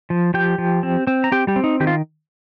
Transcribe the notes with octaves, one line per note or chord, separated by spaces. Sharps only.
F3
F3 G4 G5
F3
C4
C4
A#5
C4 G4 G5
G3 G4
C4
D#4
D#3 G4
F4